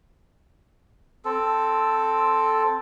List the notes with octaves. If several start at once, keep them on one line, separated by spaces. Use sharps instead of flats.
C4 A4